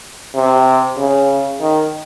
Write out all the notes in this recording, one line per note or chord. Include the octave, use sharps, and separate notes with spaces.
C3
C#3
D#3